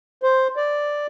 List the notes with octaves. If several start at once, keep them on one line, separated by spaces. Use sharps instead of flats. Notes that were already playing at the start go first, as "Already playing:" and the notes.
C5
D5